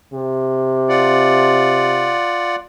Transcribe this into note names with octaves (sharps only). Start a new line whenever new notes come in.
C3
F4 D5 F#5